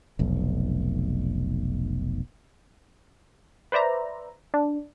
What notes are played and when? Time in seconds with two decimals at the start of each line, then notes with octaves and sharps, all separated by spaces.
0.19 F1 B1
3.72 B4 C5 D5 E5 A#5
4.54 D4